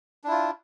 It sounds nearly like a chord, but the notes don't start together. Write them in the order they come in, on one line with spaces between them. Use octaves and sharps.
D4 E4 F4